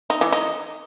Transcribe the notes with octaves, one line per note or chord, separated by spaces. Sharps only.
D#4
E3
D#4